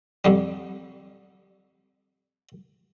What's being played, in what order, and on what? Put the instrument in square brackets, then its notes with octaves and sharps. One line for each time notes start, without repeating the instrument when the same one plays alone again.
[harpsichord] F2 D3 G3